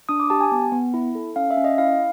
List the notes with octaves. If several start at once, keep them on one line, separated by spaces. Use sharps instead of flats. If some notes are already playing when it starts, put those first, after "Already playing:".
D4 D#6
D6
G4 A5
G#5
B3
B3
E4
A4
C#4 F5
E5
C#4
D#5
E4 F5